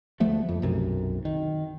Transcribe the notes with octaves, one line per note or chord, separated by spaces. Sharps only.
D2 F3 A3 B3
F2
B1 F#2 C3
D#3